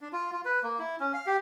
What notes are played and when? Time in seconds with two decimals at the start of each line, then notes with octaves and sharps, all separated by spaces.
0.01 D4
0.13 F4
0.32 F4
0.45 B4
0.63 A#3
0.79 E4
1.00 C#4
1.14 F5
1.27 G4